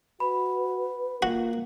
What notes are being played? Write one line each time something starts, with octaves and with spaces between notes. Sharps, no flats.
F#4 B4 B5
A#3 F4 F#4